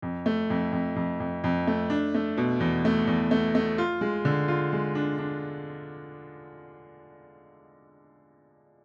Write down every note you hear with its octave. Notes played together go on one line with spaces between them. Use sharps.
F2
A3
F2
F2
F2
F2
F2
A3
D4
A3
B2
E2
A3
E2
A3
A3
F4
G#3
D3
F4
G#3
D4
D4